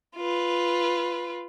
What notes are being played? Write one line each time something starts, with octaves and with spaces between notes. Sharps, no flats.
F4 B4